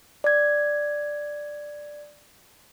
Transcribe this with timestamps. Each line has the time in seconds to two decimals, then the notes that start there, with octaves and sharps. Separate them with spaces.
0.24 D5 G#6